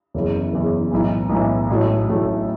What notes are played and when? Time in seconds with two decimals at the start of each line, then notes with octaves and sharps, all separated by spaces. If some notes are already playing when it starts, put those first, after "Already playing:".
0.14 F#1 E2 C#3
0.53 F#1 E2 C#3
0.91 B1 A2 E3
1.30 B1 A2 E3
1.69 A1 A2 F#3 A3
2.08 A1 A2 F#3 A3